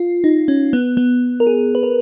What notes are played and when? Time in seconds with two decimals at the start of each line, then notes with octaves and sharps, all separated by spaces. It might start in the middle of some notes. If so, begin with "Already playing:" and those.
Already playing: F4
0.24 D#4
0.48 C#4
0.73 B3
0.97 B3
1.40 A#4
1.47 G#4
1.75 B4
1.83 A#4